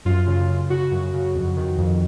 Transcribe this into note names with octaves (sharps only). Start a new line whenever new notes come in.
F#2 F4
C#3
C#3
C#3 F#4
F#2
C#3
F2
D#3
F2